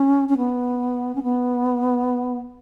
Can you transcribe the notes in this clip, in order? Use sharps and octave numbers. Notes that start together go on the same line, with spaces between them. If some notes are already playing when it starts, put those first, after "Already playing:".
Already playing: C#4
C#4
B3
C#4
B3